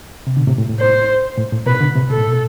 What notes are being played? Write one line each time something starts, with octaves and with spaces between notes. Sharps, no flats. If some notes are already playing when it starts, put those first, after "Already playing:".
C3
B2 D3
A2 C3
A2
A2
C5
A2
A2
B2 B4
B2 D3
A2 C3
B2 A4
A2
B2